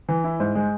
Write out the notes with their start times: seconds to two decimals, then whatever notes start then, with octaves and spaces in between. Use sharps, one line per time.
0.09 E3
0.24 E4
0.40 G#2
0.55 G#3